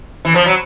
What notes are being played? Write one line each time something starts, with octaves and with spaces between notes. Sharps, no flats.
E3
F3
F#3